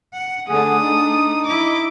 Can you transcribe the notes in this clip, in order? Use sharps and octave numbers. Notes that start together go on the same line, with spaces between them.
F#5
D3 A3 D4 G#4 F#5 D#6
D#4
E4 D#5 D6